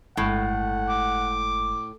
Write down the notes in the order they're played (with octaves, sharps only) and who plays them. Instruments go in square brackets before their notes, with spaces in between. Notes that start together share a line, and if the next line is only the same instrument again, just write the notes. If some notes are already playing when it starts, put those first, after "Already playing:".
[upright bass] G1 G#3 [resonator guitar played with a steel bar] A2 [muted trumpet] F#5
[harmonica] D6